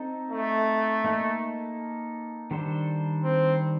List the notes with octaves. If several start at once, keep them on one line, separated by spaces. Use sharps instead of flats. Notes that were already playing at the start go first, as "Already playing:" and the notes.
Already playing: C4 D#4 A4
A3
A#3 D#4 A4
D#3 G3 D4 A4 C5
C4